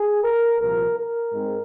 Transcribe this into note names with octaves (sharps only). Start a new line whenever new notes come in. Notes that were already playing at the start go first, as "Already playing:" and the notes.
Already playing: G#4
A#4
C2 A#2 F3 A#4
A#4
G#2 G#3 C4